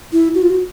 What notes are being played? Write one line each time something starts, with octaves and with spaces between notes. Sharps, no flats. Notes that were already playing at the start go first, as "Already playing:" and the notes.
E4
F#4
F4
F#4